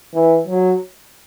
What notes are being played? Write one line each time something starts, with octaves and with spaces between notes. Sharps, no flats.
E3
F#3